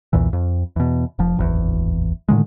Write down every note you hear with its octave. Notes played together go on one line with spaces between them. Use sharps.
B1 E2 A#2 E3
F2
E2 B2
F1 F3
D1 G#1 E2
A2 D3 D#3 G#3